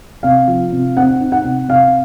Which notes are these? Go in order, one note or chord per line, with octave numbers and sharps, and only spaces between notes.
C3 F5
F3
C3
C4 F#5
D#4
F#5
C3
C3 F5